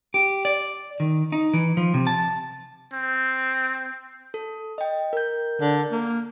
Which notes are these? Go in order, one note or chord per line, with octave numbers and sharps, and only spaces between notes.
G4
D5
D#3
D#4
E3
F3
C3
A5
C4
A4
D#5 G5
A#4 G6
D3
A#3